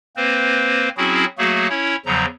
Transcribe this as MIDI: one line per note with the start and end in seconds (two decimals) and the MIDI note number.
0.17 0.89 58
0.17 0.89 60
0.17 0.89 71
0.17 0.89 72
0.97 1.25 54
0.97 1.25 60
0.97 1.25 61
0.97 1.25 64
0.97 1.25 66
0.97 1.25 68
1.38 1.67 54
1.38 1.67 57
1.38 1.67 58
1.38 1.67 66
1.38 1.67 68
1.70 1.96 61
1.70 1.96 64
1.70 1.96 73
2.06 2.25 40
2.06 2.25 49
2.06 2.25 53
2.06 2.25 54
2.06 2.25 82